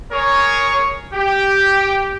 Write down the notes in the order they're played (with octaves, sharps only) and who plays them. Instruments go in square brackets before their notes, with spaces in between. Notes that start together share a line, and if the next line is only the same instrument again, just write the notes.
[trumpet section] G#4 A#4 C#5
G4